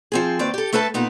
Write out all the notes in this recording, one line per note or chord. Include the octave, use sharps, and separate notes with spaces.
F3 C4 G#4
D#2 C4 B4 D5
G4 A4
A3 A4 B4 E5 A5
A#2 B3 D#4